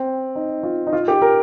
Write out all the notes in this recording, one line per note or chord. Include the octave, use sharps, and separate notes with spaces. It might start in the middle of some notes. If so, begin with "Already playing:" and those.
Already playing: C4
D#4
F4
D#4
F4
G4
A#4